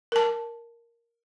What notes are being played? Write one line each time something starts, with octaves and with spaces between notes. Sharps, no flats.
A#4 A5